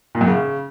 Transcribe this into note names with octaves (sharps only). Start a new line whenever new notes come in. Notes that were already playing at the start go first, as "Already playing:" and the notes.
A#2
F#2
C#3